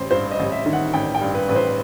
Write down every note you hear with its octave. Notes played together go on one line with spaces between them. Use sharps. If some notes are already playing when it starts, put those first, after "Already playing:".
Already playing: A1 C5
G2 C5
D#5
A1
E5
D#3
F#5
A1 G5
G5
G2
B4
A1 B4
C5